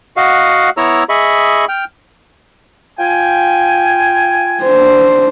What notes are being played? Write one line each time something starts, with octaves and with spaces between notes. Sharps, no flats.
F#4 D#5 F5 F#5
B3 E4 C#5 A#5 E6
G#4 D#5 E5 B5 C#6
G5 F6
F4 G5 G#5
D4 C5